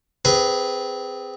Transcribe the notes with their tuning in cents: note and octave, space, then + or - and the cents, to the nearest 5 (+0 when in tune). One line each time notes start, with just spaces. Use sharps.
C4 -15 G#4 -15 B4 +0